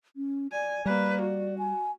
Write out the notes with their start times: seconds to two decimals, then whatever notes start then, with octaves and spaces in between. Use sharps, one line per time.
0.16 C#4
0.52 D5 G#5
0.86 G3 A#3 B4 D5
1.22 F#4
1.58 G#5